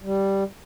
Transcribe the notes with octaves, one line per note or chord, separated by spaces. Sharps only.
G3